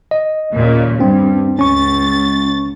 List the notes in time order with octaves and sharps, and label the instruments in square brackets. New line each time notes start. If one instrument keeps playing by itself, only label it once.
[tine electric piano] D#5
[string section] D#2 A#2 C#3
[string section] G2 [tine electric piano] C4 D4
[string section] C#2 A6 [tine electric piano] C#4 C#6